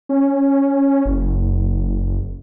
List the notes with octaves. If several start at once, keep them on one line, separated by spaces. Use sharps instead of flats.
C#4
F#1